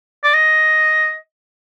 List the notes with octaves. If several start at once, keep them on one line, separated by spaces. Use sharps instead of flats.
D5
D#5